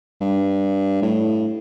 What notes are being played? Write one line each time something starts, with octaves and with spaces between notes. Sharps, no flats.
G2
A2